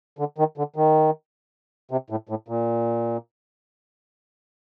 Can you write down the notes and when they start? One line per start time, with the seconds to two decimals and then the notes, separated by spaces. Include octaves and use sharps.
0.19 D3
0.38 D#3
0.58 D3
0.76 D#3
1.91 C3
2.10 A2
2.29 A2
2.48 A#2